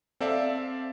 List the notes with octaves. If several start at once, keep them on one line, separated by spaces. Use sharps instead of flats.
C4 A4 D5 E5 F5 A5